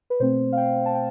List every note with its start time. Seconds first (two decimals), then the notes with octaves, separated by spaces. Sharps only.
0.10 B4
0.20 B2 A3 C4 C5
0.52 F5
0.57 G5
0.86 A5
0.95 G5